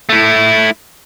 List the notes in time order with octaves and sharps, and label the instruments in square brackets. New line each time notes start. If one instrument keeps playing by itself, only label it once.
[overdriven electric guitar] A3 E4